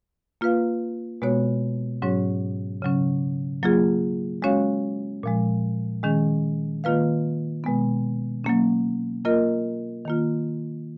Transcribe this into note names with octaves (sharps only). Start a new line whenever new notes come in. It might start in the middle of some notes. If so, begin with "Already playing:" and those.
A#3 F4 B4 F5
B2 G#3 B3 F#4 C#5
G#2 F#3 C#4 F#4 C#5
C#3 F#3 C#4
F#3 A#3 F4 G#4
G#3 C#4 F#4 C#5 F5
A#2 F3 G#3
D#3 G#3 C#4 G#4
D#3 A#3 F4 B4 F5
B2 G#3 B3
F#3 A#3 C#4
A#3 F4 A#4 D#5
D#3 A#3 F4